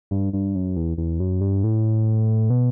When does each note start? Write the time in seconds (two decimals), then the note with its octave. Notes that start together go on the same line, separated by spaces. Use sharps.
0.11 G2
0.33 G2
0.55 F#2
0.76 E2
0.98 E2
1.20 F#2
1.41 G2
1.64 A2
2.50 B2